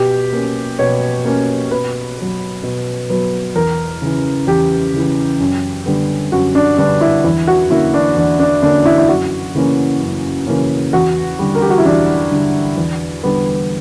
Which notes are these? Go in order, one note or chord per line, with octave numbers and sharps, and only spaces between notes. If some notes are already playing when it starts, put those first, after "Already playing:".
Already playing: B2 G4
A#3 C#4
B2 C#5
A#3 C#4
B2 B4
F#3 B3
B2
F#3 B3
E2 A#4
C#3 E3
E2 G4
C#3 E3
F#2
D3 G3 B3
F#2 F#4
D4
D3 G3 B3 D4
E4
E2 E4
F#4
D3 A#3 C#4 E4
D4
E2 D4
D4
D3 A#3 C#4 D4
E4
E4
F#2 F#4
C#3 E3 A#3 C#4
F#2
C#3 E3 A#3 C#4
E2 F#4
D3 G3
A#4
G4
F#4
E4
E2 D4
D3 G3
E2
D3 G3 B3